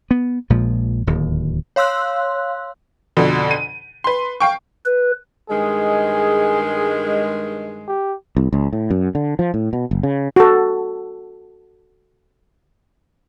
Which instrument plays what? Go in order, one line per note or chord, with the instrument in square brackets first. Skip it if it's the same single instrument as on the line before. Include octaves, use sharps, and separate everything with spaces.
[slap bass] B3
A#1 A#2 F3 G#3
D1 D#2
[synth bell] C#5 F5 C6 E6 F#6
[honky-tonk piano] F2 B2 D3
D#7
B4 C6
F5 G5 C#6
[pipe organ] B4
[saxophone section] G2 D#3 G#3 [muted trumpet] G#4
[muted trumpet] G4
[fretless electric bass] C2
C#2
A2
F#2
D3
F3
A2
B2
F#1
C#3
[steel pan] F#4 A4